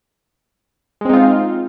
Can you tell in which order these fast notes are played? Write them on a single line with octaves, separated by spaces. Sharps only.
G#3 C4 D#4 F4